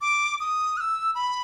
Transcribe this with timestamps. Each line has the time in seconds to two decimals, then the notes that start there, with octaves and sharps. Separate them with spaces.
0.01 D6
0.40 D#6
0.77 F#6
0.81 E6
1.15 B5